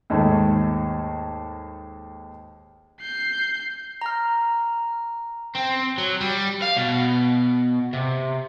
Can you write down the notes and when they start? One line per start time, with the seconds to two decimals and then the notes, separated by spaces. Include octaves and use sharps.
0.10 D#2 G#2 D#3 A3
3.01 G6 C7
4.02 A#5 F6
5.55 C4
5.98 F#3
6.21 G3
6.62 F5
6.77 B2
7.93 C3